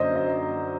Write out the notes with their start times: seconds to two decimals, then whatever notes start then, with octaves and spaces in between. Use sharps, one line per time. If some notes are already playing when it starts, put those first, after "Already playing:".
Already playing: F#2 D3 F#3 A#3 C5 D5 D#5
0.16 D#5